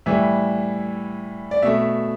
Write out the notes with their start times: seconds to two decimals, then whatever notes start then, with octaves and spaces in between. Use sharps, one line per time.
0.06 A2 E3 G3 E5
1.51 D5
1.62 B2 A3 E5